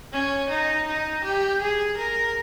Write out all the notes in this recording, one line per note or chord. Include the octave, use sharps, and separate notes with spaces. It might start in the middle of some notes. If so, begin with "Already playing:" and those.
C#4
D#4
D#4
G4
G#4
A#4